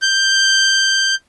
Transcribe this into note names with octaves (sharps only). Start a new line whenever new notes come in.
G6